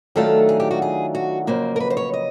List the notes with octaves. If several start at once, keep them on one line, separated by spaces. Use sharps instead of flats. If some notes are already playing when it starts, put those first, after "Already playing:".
D#3 F#3 A3 D4 F4 A4
G#4
G4
F#4
G#4
F#4
F2 C#3 F#3 A#3 C5
A#4
B4
C5
C#5
D#5